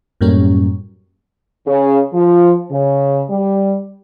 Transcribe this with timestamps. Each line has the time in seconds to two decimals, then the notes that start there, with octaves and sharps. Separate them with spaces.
0.21 F#2 A2 G3 A#3 C#4
1.66 C#3
2.13 F3
2.71 C#3
3.30 G3